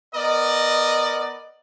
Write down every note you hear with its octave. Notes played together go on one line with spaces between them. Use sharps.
B3 A#4 D5 D#5